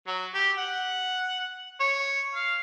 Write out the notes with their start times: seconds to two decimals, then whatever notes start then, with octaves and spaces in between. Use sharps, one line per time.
0.07 F#3
0.34 G4
0.57 F#5
1.80 C#5
2.35 F5